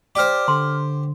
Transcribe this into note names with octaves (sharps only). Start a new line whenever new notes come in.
G4 C5 D5 D6 F6
D3 C6